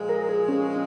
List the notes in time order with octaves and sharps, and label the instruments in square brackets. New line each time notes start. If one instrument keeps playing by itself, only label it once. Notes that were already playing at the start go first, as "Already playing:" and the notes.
Already playing: [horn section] A#2 F3 G#3
[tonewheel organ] A#4
G#4
C#4